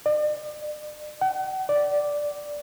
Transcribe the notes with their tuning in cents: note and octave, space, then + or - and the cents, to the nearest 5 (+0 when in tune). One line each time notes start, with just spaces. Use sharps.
D5 +40
F#5 +40
D5 -5